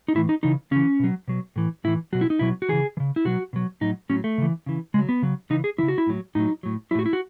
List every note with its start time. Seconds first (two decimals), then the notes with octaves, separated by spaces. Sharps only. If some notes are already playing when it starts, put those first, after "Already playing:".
0.08 D#4
0.15 A2 E3 E4
0.29 D#4
0.43 C#3 E3 D#4
0.71 C#3 E3 C#4
1.00 B2 F#3
1.28 B2 F#3
1.56 A2 E3
1.84 A2 E3 E4
2.13 B2 F#3 F#4
2.21 E4
2.30 D#4
2.39 B2 F#3 E4
2.62 F#4
2.69 C#3 E3 G#4
2.97 E3
3.00 C#3
3.16 E4
3.25 B2 F#3 F#4
3.53 B2 F#3
3.81 A2 F#3 D#4
4.09 A2 F#3 C#4
4.24 A3
4.38 C#3 E3
4.66 C#3 E3
4.94 C#3 G#3
4.99 F#3
5.09 B3
5.22 C#3 F#3
5.50 C#3 E3 D#4
5.64 G#4
5.78 E3 E4
5.83 C#3
5.88 F#4
5.98 E4
6.07 A2 F#3
6.35 A2 F#3 D#4
6.63 A2 F#3
6.91 F#3 E4
6.95 A2 F#4
7.06 E4
7.13 F#4